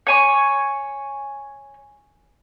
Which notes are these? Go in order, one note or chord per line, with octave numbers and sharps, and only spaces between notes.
C#5 G#5 C#6